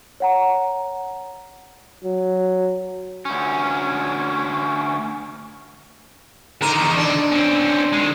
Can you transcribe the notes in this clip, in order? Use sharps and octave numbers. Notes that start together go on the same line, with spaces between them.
C#5 F#5 A#5
F#3
D2 C#4
D3 D#4 A#4
E2 D#3
D4
C4 C#4
D#3 G#3